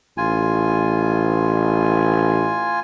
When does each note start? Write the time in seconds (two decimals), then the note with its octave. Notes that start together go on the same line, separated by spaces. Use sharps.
0.17 A1 F4 G#5